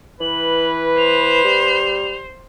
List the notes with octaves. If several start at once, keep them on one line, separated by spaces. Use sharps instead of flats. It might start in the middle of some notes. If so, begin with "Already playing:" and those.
E3 B4 F#7
C5 F7
G3